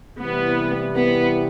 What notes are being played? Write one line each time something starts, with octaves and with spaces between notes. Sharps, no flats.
C3 E3 G3 B3 C4 E4
B3